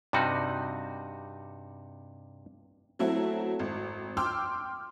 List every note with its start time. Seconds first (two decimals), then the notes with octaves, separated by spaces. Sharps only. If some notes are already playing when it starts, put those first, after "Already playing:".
0.13 G2 C3 G3 D#4 F#4
2.99 F#3 A3 C4 E4 F#4
3.59 G#1
4.17 G5 C6 D6 E6 F6